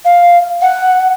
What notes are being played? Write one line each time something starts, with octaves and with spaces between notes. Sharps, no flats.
F5
F#5